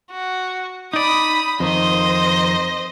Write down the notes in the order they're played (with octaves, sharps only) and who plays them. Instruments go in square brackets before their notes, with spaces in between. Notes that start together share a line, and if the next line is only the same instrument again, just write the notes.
[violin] F#4
[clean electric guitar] D#4 D5 [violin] B5 D#6
[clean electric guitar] F2 D#3 [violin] C5 D#5